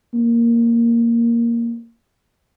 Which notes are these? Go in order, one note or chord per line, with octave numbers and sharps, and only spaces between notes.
A#3